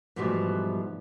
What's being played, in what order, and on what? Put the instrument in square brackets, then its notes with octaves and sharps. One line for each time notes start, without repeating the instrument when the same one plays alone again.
[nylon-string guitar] G#2 B2 E3 F3 G3 A3